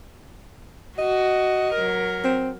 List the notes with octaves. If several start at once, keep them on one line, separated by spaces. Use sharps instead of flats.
F#4 D#5
F#3 A#4
C4